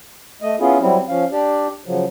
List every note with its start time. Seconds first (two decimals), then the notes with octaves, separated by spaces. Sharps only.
0.42 A3 D#5
0.60 B3 C#4 E4 F4 G#4
0.81 F#3 G3 C4 E4
1.08 F3 C#4 F5
1.32 D4 G4 D5
1.86 C#3 F3 F#3